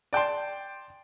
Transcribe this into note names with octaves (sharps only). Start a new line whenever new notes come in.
D5 G5 A5 C6